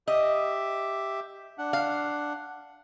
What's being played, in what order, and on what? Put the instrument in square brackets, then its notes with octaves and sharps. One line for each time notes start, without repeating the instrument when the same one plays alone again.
[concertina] G4 E5 [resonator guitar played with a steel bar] D#5
[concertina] D4 F#5
[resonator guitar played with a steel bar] F5